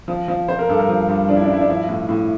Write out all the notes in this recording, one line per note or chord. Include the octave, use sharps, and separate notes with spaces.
F3
F3
F3 C5
A#4
G2 A4
A#4
F3
G2
F3 D4
E4
D4
G2 E4
D4
F3 E4
A2
A2